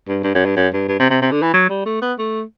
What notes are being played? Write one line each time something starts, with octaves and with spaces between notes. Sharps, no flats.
G2
G2
F#2
G2
F#2
G2
G2
C3
C3
C3
D3
E3
F#3
G3
A3
B3
A3